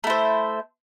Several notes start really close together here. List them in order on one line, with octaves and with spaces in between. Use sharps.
A3 E4 C5